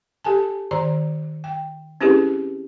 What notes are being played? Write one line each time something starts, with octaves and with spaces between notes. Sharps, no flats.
G4 A4 G#5 A5
D#3 D5 A#5
G5
C4 C#4 E4 G4 G#4 B4